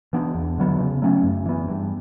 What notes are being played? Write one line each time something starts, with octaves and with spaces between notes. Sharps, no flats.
E3 B3 D4
E2
D3 F#3 B3
C#3
F#3 A3 C#4
F#2
E3 B3
G2